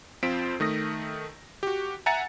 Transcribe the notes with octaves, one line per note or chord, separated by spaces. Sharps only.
F2 C4 F4 C5 B6 D7
D#3 A3 D#6 A#6
F#4 G4
E5 F#5 G#5 A#5 A6 C#7